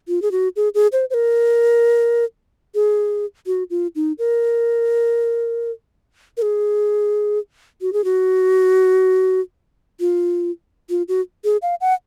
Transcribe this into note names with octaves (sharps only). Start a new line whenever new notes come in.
F4
G#4
F#4
G#4
G#4
C5
C5
A#4
G#4
F#4
F4
D#4
A#4
A#4
G#4
F#4
G#4
F#4
F4
F4
F#4
G#4
F5
F#5